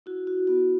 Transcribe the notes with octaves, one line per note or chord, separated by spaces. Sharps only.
E4 F#4
F#4
B3 F#4